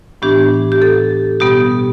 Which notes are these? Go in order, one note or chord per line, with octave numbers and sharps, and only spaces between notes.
A2 E3 B3 D4 G4
G4
A4
B2 G3 B3 G4